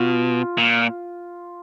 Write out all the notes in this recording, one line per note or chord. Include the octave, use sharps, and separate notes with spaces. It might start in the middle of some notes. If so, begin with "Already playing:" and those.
Already playing: B2 F4
A#2